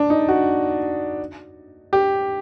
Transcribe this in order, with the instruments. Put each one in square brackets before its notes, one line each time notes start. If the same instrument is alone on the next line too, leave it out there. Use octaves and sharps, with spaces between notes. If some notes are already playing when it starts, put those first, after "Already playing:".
Already playing: [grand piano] D4
D#4
F#4
G4